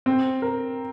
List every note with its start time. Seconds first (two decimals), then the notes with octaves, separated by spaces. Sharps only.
0.06 C4
0.42 A#4